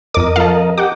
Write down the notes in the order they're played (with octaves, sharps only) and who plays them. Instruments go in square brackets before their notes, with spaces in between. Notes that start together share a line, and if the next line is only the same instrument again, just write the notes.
[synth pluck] F2 D6 [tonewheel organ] A#4 D#5
[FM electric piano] F3 C4 A4 [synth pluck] F5 A5
[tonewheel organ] G4 [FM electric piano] D#5 G5 A#5 [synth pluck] F#5 D6